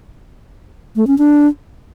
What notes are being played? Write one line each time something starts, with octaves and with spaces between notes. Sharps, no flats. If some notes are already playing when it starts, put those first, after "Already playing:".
A3
C#4
D4